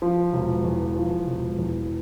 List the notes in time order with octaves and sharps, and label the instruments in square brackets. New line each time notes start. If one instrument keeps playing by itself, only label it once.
[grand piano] F3
E1
E2
F3
E1
E2